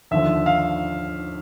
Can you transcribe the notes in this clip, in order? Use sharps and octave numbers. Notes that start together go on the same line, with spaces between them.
D#2 D3 F3 E5
F5